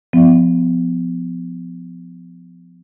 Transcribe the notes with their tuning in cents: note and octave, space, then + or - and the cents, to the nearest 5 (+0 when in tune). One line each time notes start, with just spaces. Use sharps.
F3 +5 B3 +35